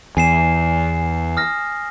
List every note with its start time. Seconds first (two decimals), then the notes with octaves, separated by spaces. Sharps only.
0.17 E2 G#5 C7 E7
1.37 D#6 F6 A#6